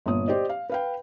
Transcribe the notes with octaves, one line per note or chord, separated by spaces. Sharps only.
G1 A#2 C#5 D#6
G4 C5 D5 D#5
F5
B4 F5 G5